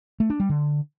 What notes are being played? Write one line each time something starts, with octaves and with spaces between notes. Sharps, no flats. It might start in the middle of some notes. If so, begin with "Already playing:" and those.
A3
D4
G3
D3